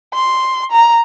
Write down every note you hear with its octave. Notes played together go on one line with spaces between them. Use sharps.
C6
A#5